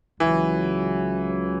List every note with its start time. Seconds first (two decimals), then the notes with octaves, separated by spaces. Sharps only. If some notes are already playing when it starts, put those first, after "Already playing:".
0.20 C#2 C#3 E3 F#3